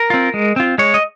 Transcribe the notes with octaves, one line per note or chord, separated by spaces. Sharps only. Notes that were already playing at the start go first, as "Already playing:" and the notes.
Already playing: A#4
C4 F4
G#3
C4 F4
G#3 C#5
D#5